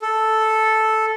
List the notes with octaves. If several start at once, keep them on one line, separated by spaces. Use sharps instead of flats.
A4